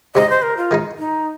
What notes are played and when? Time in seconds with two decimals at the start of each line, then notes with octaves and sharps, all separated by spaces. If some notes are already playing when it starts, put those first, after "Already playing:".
0.15 C3 G#3 C4 D#4 D#5
0.30 C5
0.43 A#4
0.57 F4
0.71 D#3 G#3 D#4
0.98 D#4